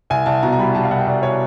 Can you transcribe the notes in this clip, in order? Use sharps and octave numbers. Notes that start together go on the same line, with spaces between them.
C2 G#5
C2 A5
B2 A#5
A#5
G3 B5
G3 A5
F5
C2 F#5
G5
C2 D5
C#5